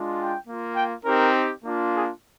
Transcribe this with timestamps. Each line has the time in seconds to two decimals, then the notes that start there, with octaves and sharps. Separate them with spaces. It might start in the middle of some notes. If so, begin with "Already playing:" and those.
Already playing: G#3 D4 F4
0.18 G5
0.47 A#3 F4
0.76 G5
1.05 C4 D#4 G4 A#4
1.64 A#3 D4 F4
1.93 G#4